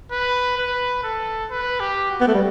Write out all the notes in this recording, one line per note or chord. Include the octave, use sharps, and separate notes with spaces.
B4
B4
A4
B4
G4
F#4
B3
A3
G3